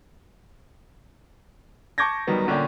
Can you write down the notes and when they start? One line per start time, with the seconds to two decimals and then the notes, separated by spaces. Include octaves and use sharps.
1.98 A5 C#6 D6 G6 G#6 A#6
2.27 D#3 F#3 G3 B3
2.47 A#2 D3 C#4 A#4 D5 G5